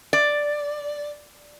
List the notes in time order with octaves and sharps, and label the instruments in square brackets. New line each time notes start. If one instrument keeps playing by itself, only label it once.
[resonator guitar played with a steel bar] D5